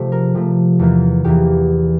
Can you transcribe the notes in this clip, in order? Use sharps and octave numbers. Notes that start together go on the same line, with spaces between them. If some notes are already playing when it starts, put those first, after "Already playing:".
Already playing: C3 F3 A3
A#4
C3 F3 A3
E2 E3 A#3
E2 E3 A#3 G4